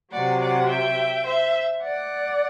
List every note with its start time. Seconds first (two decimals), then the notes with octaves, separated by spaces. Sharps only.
0.12 C3 F#3 D5 F#5
0.41 D5 F#5
0.69 E5 G5
1.26 C5 E5
1.82 D5 F#5